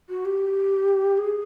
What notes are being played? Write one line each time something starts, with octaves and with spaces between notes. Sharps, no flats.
F#4
G4
G#4